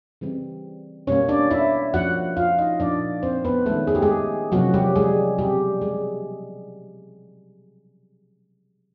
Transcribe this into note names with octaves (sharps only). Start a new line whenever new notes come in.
C#3 E3 G3 C4
B2 G3 A#3 C#4 C#5
D4 D5
E4 E5
F3 A#3 C#4 F#4 F#5
F4 F5
D#4 D#5
A#2 F3 A#3 D4 D#4 D5
C4 C5
B3 B4
D#3 G#3 A3 C#4 A4
G#4
G4
G#3 G#4
C3 F3 F#3 A#3 C#4 F#4
G3 G4
G#3 G#4
B2 G3 G#3 C4 G4
G#3 G#4